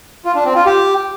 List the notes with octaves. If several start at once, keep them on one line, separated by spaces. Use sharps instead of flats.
F4
D4
C4
F4
G4